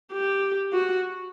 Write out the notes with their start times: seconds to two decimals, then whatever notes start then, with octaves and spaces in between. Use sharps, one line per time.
0.12 G4
0.73 F#4